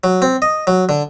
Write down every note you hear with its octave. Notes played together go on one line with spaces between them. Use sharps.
F#3
C4
D#5
F#3
D3